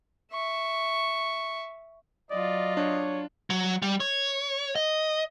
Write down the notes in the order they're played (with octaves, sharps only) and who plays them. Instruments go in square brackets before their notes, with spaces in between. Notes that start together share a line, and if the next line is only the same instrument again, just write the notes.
[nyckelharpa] E5 C#6
[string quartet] F#3 F4 [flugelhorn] D5 [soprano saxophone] D#5
[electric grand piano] D4 [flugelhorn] C#5
[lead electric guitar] F#3
G3
C#5
D#5